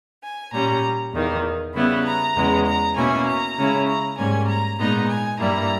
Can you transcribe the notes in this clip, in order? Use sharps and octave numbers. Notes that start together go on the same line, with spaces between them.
G#5
A#2 G3 C#4 A#5
E2 D#3 A#3
C#3 G3 B3 E4 B5
A#5
E2 C#3 G#3 B3
A#5
B2 A#3 C#4 E4 G#5
A#5
C#3 G#3 C#4 E4
A#5
G#2 G3 A#3 C#4 G#5
A#5
A#2 G#3 B3 D#4 A#5
G#5
G2 G3 A#3 E4 A#5